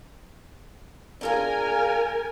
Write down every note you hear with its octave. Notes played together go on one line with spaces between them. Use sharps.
D4 F4 G#4 A#4 G#5